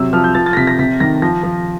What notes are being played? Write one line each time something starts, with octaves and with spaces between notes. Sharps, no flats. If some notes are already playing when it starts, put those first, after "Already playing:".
Already playing: C3 F#3 E6
F3 F6
G6
F3 A6
A6
A#6
C3 B6
A#6
C3 B6
D#3 A#6
F3 A#6
F3